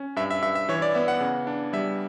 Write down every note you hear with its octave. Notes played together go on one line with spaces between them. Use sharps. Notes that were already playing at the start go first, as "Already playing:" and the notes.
Already playing: C#4
G2 E5
E5
G2 E5
E5
E3 C#5
D5
B3 E5
F#5
C#3
D4
G3 E5